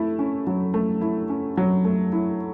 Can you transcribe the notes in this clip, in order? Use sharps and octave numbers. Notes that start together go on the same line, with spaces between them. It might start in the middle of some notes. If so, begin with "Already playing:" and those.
Already playing: A3 E4
C#4
F#3
A3
E4
C#4
F#3
A3
E4